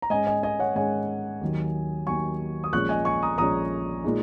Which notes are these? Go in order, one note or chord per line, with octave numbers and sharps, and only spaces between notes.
A#5
G#2 G#3 C#4 D#5 G#5
D#5 G#5
D#5 G#5
C#5 F#5
G#2 G#3 C#4 D#5 G#5
D#2 D#3 F#3
D#2 D#3 F#3 G#5 C#6
D#6
A#1 A#2 G#3 C#4 C#6 F#6
D#5 G#5
G#5 C#6
A#5 D#6
A#1 A#2 G#3 C#4 A#5 D#6
A#2 G#3 D#4